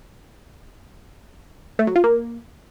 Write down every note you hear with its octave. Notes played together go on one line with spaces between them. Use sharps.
A3
F#3
F4
A#3